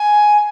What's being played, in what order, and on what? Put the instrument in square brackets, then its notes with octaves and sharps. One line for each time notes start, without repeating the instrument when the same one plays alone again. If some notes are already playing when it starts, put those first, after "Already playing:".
Already playing: [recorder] G#5